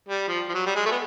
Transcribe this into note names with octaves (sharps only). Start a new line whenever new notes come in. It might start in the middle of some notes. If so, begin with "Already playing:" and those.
G3
F3
F3
F#3
G3
G#3
A3
B3